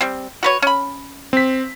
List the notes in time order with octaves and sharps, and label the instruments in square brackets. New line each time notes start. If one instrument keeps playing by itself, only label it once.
[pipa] G3 C4
F#4 B4 C#5
C#4 B5
[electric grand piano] C4 B6